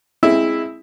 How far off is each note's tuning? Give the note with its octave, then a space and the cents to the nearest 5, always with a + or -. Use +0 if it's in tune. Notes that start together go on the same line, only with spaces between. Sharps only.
G#3 +0 C4 +25 E4 +0